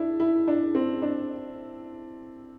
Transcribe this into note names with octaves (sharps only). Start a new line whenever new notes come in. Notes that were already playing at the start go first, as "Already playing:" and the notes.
Already playing: D4 E4
E4
D4
C4
D4